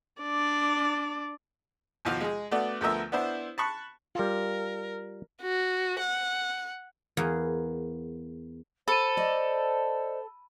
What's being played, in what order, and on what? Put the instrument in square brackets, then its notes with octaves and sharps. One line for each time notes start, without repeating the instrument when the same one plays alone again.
[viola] D4 D5
[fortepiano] D#2 B2 F3 F4 F#4 F5
G#3 G#4
A3 B3 D4 F#4 D5
D2 F3 A3 B3 A#4 E5
B3 D4 E4 C5
A5 B5 C#6 F#6
[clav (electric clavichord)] G3 F4 [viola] A#4
[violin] F#4
F#5
[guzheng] E2 A#3 G#4
[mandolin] A4 [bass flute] C5 [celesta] B5 D#7
[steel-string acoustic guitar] D5 D#5